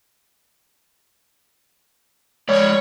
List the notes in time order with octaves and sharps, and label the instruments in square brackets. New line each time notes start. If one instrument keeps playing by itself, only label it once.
[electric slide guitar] G#3 D5 [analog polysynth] C#5